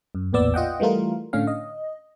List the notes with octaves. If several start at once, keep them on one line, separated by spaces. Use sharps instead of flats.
F#2
A1 E2 A#2 B3 D5 E6
F4 D#5 F#5 G5
E3 G3 A3 F4 A#4
A2 D3 C#4 F5
D#5